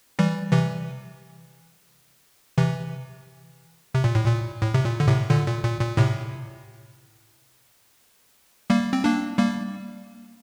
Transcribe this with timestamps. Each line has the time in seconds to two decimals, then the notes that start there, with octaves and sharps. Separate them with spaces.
0.19 E3 G3
0.52 C3 E3
2.57 C3 E3
3.94 C3
4.04 A#2
4.15 A2
4.26 A#2
4.62 A2
4.74 C3
4.85 A#2
5.00 D3
5.07 A2 C3
5.30 A#2 D3
5.47 A#2
5.64 A#2
5.81 A#2
5.97 A2 C3
8.70 G3 A#3
8.93 C4
9.04 A#3 D4
9.38 G3 A#3